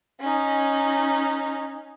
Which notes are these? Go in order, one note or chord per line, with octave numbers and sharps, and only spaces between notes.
C#4 D#4